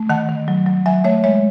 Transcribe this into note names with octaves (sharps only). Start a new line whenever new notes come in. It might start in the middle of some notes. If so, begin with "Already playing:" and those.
Already playing: A3
D#3 F#5 A5
D#3
F#3
F#3
F#3 E5 G#5
A3 C#5 E5
G#3 C#5 E5